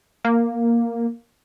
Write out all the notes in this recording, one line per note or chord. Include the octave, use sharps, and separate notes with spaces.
A#3